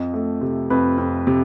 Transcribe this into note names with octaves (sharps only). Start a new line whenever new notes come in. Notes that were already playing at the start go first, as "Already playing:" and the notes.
Already playing: F2 D#5
A3
C3
F2 B4
F2
C3